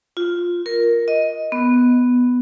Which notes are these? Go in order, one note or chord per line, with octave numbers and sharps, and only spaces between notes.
F4
A#4
D#5
B3